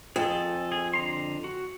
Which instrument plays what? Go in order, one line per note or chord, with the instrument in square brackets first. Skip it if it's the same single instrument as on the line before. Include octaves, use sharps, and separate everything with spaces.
[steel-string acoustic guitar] F2 [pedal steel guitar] G#4 A4
[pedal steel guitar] G#4
D3 A#5 C6
F#4